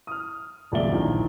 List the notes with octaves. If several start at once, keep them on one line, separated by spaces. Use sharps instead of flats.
D#6 F6
D#1 C#2 F#3 D5 E5 G7
A#1 D#3 E3 A#5